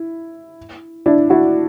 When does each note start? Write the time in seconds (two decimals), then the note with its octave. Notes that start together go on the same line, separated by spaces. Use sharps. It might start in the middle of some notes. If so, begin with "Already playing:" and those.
Already playing: E4
1.06 D4 E4
1.30 E4 F#4